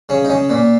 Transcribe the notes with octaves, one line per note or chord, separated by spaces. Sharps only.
C#3 C#4
D#4
C#3 C#4
A#2 A#3